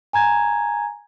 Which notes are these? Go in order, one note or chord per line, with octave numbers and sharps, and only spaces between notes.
G#5 A#5 G#6